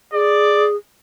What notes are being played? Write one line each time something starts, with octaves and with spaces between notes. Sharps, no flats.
G#4 D5